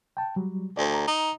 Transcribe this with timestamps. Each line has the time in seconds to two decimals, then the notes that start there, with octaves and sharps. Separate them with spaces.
0.17 G5 A5
0.36 F#3 G3
0.77 D2 C5 D5
0.94 A#5
1.07 D#4